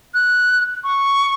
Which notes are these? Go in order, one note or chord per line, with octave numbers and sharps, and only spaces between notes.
F#6
C#6